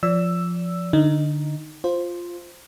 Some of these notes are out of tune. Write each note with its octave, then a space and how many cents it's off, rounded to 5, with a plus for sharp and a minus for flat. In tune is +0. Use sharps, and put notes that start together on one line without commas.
F3 +0 D5 -30 E6 +5
D3 +15 D#4 +0
F4 +0 C5 +0